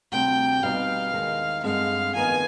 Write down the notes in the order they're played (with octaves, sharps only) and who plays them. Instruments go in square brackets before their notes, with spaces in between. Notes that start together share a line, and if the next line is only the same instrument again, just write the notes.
[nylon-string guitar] D2 C3 G3 C4 [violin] G5
[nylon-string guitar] B2 G3 C4 D#4 [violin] F5
[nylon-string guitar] D#2 D#3 G#3
[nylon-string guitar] G2 D3 G#3 C4 [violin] F5
[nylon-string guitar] F2 D#3 B3 D#4 [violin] G#5